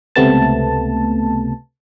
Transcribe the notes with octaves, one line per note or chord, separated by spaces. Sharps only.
C#2 C3 A3 B3 A5